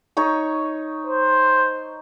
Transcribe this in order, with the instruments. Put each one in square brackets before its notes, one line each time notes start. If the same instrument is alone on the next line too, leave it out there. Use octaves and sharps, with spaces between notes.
[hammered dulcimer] D#4 C#5 C#6
[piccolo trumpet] C5